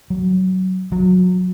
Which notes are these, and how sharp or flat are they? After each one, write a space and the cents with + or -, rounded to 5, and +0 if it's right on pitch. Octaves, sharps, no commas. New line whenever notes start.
F#3 +15
F#3 -25